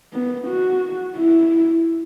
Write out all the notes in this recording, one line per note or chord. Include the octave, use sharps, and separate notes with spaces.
B3
F#4
E4